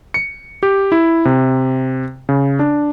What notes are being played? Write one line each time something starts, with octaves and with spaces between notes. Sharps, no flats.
C#7
G4
E4
C3
C#3
D4